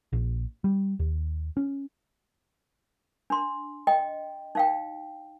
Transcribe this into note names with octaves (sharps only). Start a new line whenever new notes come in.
A#1
G3
D#2
C#4
D4 C6
D#5 G5
D#4 F5 G5